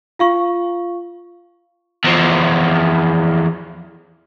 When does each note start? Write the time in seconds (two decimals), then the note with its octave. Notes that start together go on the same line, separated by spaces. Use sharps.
0.19 F4 F5 C#6
2.04 E2 F3